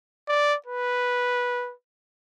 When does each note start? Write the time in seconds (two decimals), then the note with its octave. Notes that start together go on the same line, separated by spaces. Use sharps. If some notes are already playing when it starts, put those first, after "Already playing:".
0.28 D5
0.66 B4